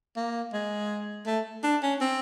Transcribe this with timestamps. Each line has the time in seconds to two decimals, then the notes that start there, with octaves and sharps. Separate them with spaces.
0.17 A#3
0.53 G#3
1.27 A3
1.64 D4
1.82 C#4
2.01 C4